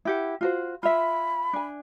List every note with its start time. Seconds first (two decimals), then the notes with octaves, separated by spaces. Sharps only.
0.05 E4 G4 F#5
0.41 F4 F#4 C5
0.83 F4 E5 B5
1.53 D4 G#5